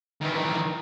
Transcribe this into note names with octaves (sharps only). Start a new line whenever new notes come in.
D#3 E3